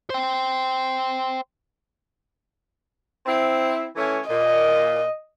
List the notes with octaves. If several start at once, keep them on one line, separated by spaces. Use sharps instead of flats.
C5 G5
C4 E4
E3 A3 C#4
A#2 D#5